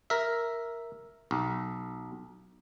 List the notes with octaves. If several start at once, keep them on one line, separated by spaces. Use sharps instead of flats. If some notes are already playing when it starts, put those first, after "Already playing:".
A#4 E5
B1